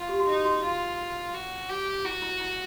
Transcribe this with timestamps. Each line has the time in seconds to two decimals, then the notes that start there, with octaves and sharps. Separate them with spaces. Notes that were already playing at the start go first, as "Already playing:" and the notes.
Already playing: F4
0.09 G4
0.19 F#4
0.27 D#4 G4
0.44 F#4
0.63 F4
1.34 F#4
1.69 G4
2.05 E4 F#4
2.22 E4
2.40 E4